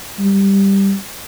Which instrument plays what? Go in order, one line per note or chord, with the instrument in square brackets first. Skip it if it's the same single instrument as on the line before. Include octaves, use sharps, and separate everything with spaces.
[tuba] G3